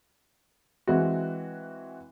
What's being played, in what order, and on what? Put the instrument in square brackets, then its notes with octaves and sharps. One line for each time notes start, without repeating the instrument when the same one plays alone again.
[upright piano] E3 G#3 C4 F#4